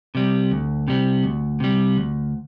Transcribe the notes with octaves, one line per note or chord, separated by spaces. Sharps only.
C3 G3
D2
C3 G3
D2
C3 G3
D2